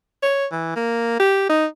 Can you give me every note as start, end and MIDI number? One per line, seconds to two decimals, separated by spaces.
0.23 0.46 73
0.52 0.74 52
0.76 1.18 58
1.20 1.48 67
1.49 1.66 63